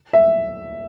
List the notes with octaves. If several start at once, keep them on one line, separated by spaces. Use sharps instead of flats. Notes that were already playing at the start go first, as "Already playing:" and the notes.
E5